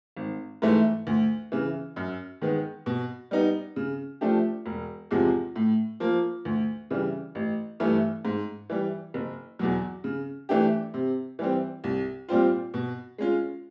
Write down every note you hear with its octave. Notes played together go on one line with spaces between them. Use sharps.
G#1
G#2 E3 A3
D2
C#3 E3
F#2
D#3 G#3 B3
B2
G3 B3 D#4
C#3
F3 A3 D4 G4
E1
E2 C3 F3 G#3
A2
F3 A#3
D2
C#3 E3 G3
A1
G2 E3 A3
G#2
E3 G3
F#1
E2 B2 F#3
C#3
E3 A3 D4 G4
C3
E3 G3 C4
C2
A#2 G3 C4 F4
B2
G#3 C#4 F4